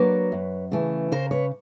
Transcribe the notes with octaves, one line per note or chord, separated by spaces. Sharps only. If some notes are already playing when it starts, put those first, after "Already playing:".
Already playing: F#3 A#3 D4 B4 C#5
F#2
C#3 E3 A3
C#3 A#4 C5
B4 C#5